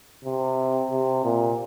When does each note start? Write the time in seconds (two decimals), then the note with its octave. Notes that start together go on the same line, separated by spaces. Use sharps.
0.25 C3
0.91 C3
1.24 A#2